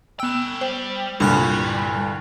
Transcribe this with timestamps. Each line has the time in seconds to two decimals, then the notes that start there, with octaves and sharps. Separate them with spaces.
0.20 B3 C#4 G5 E6
0.61 G3 C5
1.20 C2 G2 A#2 D3 G3 C#6 F6 F#6